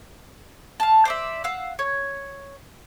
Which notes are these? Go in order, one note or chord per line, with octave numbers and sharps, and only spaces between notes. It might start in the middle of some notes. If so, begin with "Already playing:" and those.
F5 A5
C5 D5 E5
F5 F#5 E6
C#5